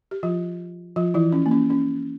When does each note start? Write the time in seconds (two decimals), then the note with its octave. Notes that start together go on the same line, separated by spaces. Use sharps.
0.11 G4
0.23 F3 F4
0.96 F3 F4
1.14 E3 E4
1.33 C#4
1.46 A#3
1.51 C#4
1.70 C#4